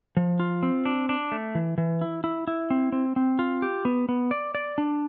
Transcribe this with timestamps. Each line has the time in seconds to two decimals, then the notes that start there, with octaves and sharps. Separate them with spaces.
0.17 F3
0.40 F4
0.63 C4
0.85 D4
1.09 D4
1.32 A3
1.55 E3
1.78 E3
2.01 E4
2.24 E4
2.48 E4
2.70 C4
2.92 C4
3.16 C4
3.39 F4
3.62 G4
3.85 B3
4.09 B3
4.31 D5
4.55 D5
4.78 D4